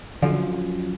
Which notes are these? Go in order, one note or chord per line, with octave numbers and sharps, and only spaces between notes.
F#2 D3 F3